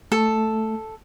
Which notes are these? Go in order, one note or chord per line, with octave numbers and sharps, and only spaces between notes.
A3 A4